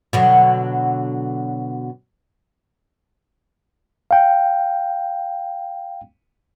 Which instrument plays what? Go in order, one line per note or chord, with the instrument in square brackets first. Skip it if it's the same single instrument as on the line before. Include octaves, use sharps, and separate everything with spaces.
[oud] B2 D3 F#3
[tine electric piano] F5 G5